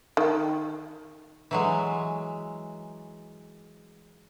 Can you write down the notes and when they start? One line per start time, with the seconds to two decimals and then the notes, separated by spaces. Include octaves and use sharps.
0.17 D#3
1.51 E3 F#3 G#3